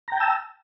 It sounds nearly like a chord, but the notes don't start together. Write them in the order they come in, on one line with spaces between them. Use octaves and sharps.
A#5 G5 A5 E6